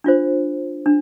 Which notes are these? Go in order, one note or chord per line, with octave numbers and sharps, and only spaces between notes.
D4 F4 C5
D4